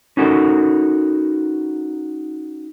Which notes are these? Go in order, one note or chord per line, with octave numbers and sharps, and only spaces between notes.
C#4 D#4 F#4 A4 A#4